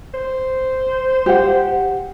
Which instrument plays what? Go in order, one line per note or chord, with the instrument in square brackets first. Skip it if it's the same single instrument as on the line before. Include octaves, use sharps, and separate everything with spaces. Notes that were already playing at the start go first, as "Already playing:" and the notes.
[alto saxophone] C5
[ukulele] G4 F#5